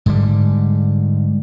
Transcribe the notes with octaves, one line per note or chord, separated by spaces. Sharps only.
G#2 D3 G3